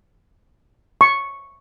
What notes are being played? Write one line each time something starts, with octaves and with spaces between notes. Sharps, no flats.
C#6